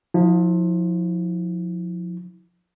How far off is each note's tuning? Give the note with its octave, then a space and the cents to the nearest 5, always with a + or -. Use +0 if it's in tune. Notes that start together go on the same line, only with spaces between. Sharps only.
F3 +25 E4 -25